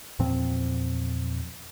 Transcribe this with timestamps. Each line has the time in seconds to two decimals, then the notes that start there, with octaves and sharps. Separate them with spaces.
0.19 E2 A#2 F3 C4